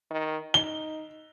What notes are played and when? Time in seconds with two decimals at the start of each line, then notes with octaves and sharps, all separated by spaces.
0.11 D#3
0.54 D#4 G7